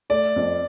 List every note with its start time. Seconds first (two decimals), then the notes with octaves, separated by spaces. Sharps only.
0.10 A3 D5
0.36 F2